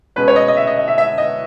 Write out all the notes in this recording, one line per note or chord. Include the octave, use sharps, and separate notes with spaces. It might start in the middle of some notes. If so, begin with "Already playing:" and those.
B2 G#3 C#4 B4
C#5
D#5
D#5
E5
D#5
D#5
E5
E5
D#5